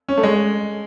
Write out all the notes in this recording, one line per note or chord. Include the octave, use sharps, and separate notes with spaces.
C#4
A3
G#3